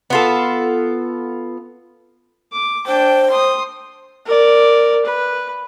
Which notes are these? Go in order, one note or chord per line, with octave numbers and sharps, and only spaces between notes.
B3 F4 A4
D6
D4 C5 G5
C6 D#6
A#4 D5
B4